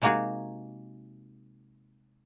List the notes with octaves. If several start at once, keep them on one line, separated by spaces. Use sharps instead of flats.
C3 G#3 A#3 D#4 F#4 G#4